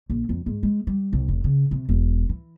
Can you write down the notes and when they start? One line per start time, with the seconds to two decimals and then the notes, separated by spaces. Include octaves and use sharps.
0.10 A#1
0.29 F2
0.46 G#2
0.63 G#3
0.87 G3
1.13 C2
1.28 F1
1.44 C#3
1.71 C3
1.89 E1
2.29 E3